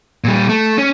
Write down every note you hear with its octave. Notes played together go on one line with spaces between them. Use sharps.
A#2 G3
A3
C#4